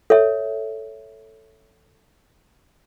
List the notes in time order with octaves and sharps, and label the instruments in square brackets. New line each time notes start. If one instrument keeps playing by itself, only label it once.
[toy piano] A4 C#5 E5